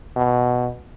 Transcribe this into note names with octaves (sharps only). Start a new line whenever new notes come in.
B2